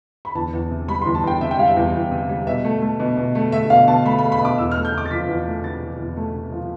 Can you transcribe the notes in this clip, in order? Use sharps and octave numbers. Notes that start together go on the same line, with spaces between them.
B5
E2 A5
E2
C3
G3 B5
C6
E2
A5
E2 G5
C3 E5
G5
G3 F5
E5
E2
E2
C3
G3
B2 E5
A3
A3
B2
B2
A3
A3 E5
B2 F5
B2 A5
A3 B5
B5
A3
B5
B2 D6
E2 E6
F6
A3
G6
C3 D6
A6
F3 B6
E2
A3
C3 A6
F3
E2
A3
C3
F3